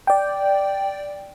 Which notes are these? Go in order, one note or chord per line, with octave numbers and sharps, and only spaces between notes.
D5 G5